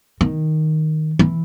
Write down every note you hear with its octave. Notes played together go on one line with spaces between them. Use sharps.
D#3
E3